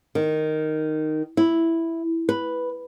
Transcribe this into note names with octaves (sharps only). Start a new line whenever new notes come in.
D#3
E4
B4